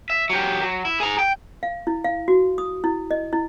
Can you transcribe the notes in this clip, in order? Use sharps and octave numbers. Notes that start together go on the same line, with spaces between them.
E5
F#3 G4
F#3
E4
G#4 A#5
G5
F5
E4
F5
F#4
D#6
E4
D#5
E4